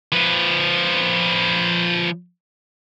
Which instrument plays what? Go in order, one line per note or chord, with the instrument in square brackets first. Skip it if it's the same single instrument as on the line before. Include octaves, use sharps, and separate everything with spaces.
[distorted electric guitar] F3 B4